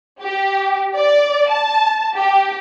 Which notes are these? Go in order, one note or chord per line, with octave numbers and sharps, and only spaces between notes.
G4
D5
A5
G4